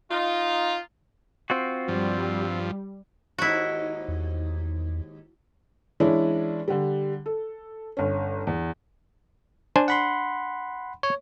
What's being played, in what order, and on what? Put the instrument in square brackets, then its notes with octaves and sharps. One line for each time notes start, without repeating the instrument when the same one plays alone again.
[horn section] D#4 F4
[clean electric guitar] C4 F4 F#4
[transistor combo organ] G2 F3 [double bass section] G3
[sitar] D#2 G#2 D#4 [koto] E4 F#4
[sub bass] E2
[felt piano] E3 G#3 C#4 D4 E4
D3 G3
A4
G1 C#4
E2
[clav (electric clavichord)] D4 C5 G#5
[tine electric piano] F#5 B5 C6
C#5